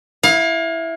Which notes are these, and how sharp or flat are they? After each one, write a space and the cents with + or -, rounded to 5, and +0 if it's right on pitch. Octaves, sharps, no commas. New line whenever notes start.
E4 +0 F5 +30